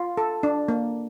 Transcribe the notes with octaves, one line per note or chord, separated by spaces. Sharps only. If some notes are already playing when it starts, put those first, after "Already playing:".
Already playing: F4
A4
D4
A#3